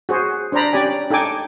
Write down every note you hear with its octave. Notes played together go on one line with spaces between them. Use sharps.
F#4 G#4 C5
D4 C5 D5 A#5 B5
C#4 G4 D5 G#5
D#4 A4 G5 G#5 D6